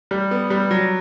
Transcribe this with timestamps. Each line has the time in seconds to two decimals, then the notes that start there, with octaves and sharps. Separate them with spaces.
0.11 G3
0.31 B3
0.50 G3
0.71 F#3